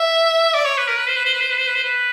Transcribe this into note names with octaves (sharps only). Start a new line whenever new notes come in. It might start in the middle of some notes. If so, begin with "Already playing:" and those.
Already playing: E5
D5
C#5
B4
A#4
B4
C5
B4
C5
B4
C5
B4
C5
B4
C5
B4